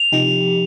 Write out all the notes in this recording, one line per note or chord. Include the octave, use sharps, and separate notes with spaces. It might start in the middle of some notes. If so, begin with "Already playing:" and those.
Already playing: F7
C3 F3 D#4 G4